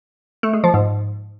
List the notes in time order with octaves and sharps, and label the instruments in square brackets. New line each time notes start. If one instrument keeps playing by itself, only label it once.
[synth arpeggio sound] A3
G#3
F3
G#2